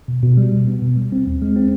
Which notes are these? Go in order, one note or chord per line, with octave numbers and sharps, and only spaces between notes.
B2
B2
G3
B2
B3
B2
G3
C4
D#2
G#3
C4